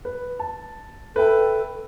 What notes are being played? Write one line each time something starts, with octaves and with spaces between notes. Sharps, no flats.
B4
A5
A4 B4 E5 G5